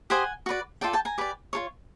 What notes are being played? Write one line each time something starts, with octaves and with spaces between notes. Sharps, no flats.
G4 C5 D#5 F#5 G#5
F#4 B4 D5
F4 A4 D5 G5 A5
G5 A5
G#5 A#5
G4 B4 D5
F4 A4 C#5